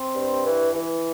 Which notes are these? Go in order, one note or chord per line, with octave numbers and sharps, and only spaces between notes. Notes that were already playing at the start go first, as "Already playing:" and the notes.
Already playing: C4
G2
E3
E3